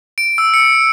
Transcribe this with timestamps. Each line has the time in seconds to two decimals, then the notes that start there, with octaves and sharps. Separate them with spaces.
0.18 D7
0.38 E6
0.54 C#7